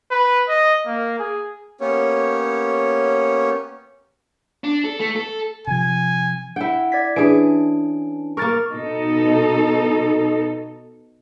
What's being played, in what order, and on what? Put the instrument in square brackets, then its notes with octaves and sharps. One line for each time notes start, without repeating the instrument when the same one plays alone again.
[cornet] B4
D#5
A#3
G#4
[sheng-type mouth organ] A#3 B3 C#4 G4 C#5
[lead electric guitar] D4
A4
A3
A4
[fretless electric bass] C3 F3 [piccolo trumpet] G#5
[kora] E4 G5 [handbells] F#5
[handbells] D5 G#6 B6
[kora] E3 G#4 [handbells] C#4 D4 D7
[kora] A#3 A#4 [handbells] C#6 F6 A6
[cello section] B2 D#4 A4